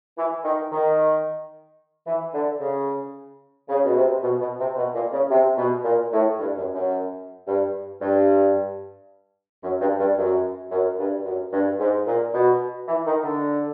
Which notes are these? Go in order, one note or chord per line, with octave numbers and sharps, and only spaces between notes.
E3
D#3
D#3
E3
D3
C#3
C#3
B2
C3
B2
B2
C3
B2
A#2
C#3
C3
B2
A#2
A2
G2
F#2
F#2
G2
G2
F#2
G2
G2
F#2
F#2
G2
F#2
G2
G#2
A#2
B2
E3
D#3
D3